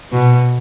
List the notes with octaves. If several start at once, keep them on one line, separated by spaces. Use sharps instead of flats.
B2